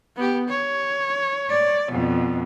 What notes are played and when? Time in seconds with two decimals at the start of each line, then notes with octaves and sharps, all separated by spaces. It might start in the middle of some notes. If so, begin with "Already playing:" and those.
0.16 B3 G4
0.49 C#5
1.50 D5
1.92 F2 B2